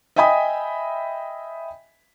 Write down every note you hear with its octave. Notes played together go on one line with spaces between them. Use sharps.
D#5 E5 G5 G#5 B5 D#6